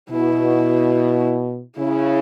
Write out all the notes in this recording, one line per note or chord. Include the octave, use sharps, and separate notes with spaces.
B2 E4
C#3 E4